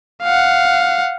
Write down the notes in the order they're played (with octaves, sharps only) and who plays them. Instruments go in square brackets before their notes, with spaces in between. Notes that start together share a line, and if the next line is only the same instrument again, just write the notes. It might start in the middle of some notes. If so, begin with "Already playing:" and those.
[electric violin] F5 F#5